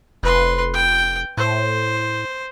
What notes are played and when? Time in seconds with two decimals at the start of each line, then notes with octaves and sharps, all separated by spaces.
0.23 F1 B4 C6
0.73 G5
1.37 A2 C5